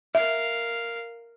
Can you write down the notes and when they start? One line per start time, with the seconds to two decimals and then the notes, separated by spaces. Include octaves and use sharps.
0.15 A#4 E5 F5